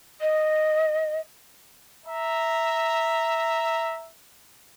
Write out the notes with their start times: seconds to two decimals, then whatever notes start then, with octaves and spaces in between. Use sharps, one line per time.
0.21 D#5
2.07 E5 A#5